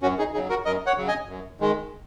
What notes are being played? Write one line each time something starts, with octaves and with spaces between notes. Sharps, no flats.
F#2 C#4 F#4
D#4 G#4
C#3 F#3 D#4 G#4
F#4 A#4
F#2 A#4 D#5
C#5 F#5
C#3 F#3
D#5 G#5
F#2
D#3 G#3